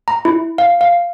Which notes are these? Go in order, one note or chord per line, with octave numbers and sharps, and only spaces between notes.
A#5
E4
F5
F5